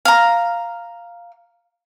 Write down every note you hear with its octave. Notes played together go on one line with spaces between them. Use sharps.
F5 A#5